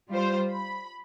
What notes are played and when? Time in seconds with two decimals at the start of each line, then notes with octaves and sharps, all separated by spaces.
0.11 G3 F4 C5
0.51 B5